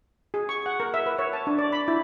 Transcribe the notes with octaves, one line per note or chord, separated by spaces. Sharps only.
G#4
C#6
F#5
A#4
E5
B4
C#5
A5
D4
D5
B5
E4